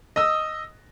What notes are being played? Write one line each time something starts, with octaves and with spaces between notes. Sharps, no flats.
D#5 D#6 E6